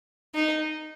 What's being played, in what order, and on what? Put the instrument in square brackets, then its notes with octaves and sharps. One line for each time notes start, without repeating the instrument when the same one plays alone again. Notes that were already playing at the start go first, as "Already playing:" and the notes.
[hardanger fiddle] D#4